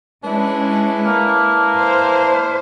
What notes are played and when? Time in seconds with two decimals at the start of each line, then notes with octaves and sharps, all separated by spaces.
0.24 G#3 C#4 D4 E4 B4
1.06 A#3
1.75 C5